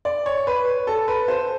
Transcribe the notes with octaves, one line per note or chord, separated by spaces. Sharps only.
D5
C#5
B4
A4
B4
C5